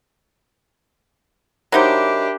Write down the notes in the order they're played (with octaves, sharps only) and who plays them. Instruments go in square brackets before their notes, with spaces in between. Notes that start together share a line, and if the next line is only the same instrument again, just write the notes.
[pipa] F#3 D#4 C5 [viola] D4 G4 [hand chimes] A#4 E5 B5